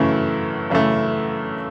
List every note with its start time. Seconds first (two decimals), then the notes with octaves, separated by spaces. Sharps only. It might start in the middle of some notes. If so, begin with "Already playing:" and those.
Already playing: F#2 C#3 E3 A3 C#6
0.70 F#2 C#3 E3 A3